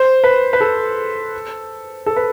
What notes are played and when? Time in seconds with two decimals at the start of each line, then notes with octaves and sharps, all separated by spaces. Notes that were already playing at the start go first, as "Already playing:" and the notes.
Already playing: C5
0.24 B4
0.53 B4
0.61 A4
2.06 A4
2.16 B4